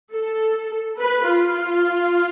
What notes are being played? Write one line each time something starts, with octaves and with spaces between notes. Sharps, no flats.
A4
B4
F4